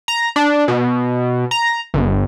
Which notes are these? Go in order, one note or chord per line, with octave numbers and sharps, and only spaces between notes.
A#5
D4
B2
A#5
G1